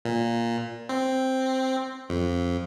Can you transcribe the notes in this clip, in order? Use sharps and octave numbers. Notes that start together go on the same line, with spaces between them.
A#2
C4
F2